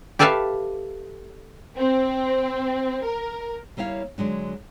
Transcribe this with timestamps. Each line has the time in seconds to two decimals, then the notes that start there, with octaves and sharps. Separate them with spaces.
0.19 G4 A4 B4 E5 F5 A5
1.77 C4
3.03 A#4
3.77 G3 A#3 E4 C#5 F5
4.18 D3 F#3 G#3 D4